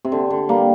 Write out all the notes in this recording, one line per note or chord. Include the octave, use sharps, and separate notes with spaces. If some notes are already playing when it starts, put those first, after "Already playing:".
C3
D3
D3
G3 A#3